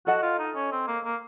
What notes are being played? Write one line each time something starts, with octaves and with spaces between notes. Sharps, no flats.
F#4 A4 D#5 F#5 A5
F4
D#4
C#4
C4
A#3
A#3